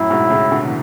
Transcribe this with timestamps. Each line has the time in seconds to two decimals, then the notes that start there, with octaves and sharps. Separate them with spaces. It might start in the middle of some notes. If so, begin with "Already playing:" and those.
Already playing: F#2 A2 E4
0.10 G#2 B2
0.30 A2 C#3
0.51 B2 D3
0.67 E3